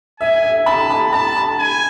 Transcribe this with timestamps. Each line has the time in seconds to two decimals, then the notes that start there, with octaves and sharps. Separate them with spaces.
0.20 E5 G#5
0.43 E5
0.66 A5 B5
0.90 B5
1.13 A5 B5
1.37 B5
1.59 G#5